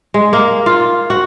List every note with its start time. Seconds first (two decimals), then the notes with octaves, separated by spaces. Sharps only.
0.14 G#3
0.33 A#3
0.66 F4
1.10 F#4